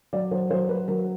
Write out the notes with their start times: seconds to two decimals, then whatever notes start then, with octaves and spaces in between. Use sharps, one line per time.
0.13 F#3 D5
0.31 F#3 C5
0.50 F#3 C5
0.69 F#3 B4
0.88 F#3 A#4